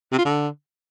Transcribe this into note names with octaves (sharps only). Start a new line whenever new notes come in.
C3
F4
D3